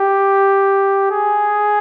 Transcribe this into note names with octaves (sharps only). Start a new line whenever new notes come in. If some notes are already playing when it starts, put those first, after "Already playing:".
Already playing: G4
G#4